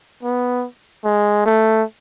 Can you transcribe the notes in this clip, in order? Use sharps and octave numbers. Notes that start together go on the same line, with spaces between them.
B3
G#3
A3